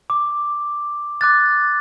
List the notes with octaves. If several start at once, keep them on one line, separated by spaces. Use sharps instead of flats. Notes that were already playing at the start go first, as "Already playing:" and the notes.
D6
D6 F#6 A6